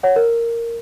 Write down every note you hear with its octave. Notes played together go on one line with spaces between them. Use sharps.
C#5 F#5
A#4